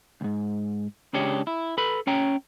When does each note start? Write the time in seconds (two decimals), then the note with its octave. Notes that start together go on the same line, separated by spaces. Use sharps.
0.21 C#2 G#2
1.13 C#2 C#3 D4 G4 C#5
1.47 E4
1.78 A4 B4 B5
2.07 C#4 C#5 G5 A#5